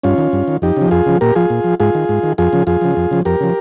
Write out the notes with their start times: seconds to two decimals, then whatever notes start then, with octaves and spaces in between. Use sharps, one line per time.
0.03 G2 C#4 F4
0.18 D#3
0.33 G2
0.48 D#3
0.62 F2 D#4 G4
0.76 C#3 F3
0.91 F2 F4 G#4
1.06 C#3 F3
1.21 A#2 G4 A#4
1.35 F3 F4 G#4
1.50 A#2
1.64 F3
1.80 G#2 F4 G#4
1.95 D#3
2.09 G#2
2.23 D#3
2.38 F2 F4 G#4
2.53 C#3 F3
2.67 F2 F4 G#4
2.81 C#3 F3
2.97 F2
3.11 C#3 F3
3.25 F2 G4 A#4
3.40 C#3 F3